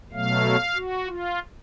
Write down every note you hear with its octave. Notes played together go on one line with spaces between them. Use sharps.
B2 F#3 A3 F5
F#4
F4